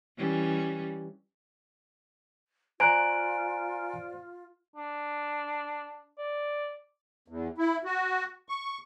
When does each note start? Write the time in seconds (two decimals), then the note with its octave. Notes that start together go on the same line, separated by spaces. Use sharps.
0.17 E3 G3 C#4
2.80 F4 C5 D5 G#5 A#5 F#6 D7
4.76 D4
6.18 D5
7.28 E2
7.58 E4
7.84 F#4
8.49 C#6